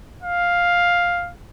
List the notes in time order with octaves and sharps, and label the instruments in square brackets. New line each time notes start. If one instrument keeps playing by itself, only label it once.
[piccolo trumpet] F5